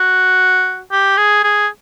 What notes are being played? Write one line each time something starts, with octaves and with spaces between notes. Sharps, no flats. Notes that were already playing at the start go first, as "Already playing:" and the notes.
Already playing: F#4
G4
G#4
G#4